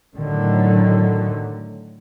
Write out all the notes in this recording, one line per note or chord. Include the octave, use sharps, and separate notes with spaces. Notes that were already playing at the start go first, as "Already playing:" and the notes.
A2 D3 D#3 F#3